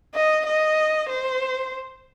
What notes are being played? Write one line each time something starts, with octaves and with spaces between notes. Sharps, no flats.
D#5
D#5
C5